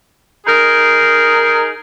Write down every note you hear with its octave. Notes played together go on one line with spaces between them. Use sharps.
D#4 G#4 A#4